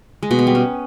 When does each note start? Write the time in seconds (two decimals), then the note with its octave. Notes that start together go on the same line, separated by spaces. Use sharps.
0.23 G#3
0.31 B2
0.39 B3
0.47 G3
0.55 C#4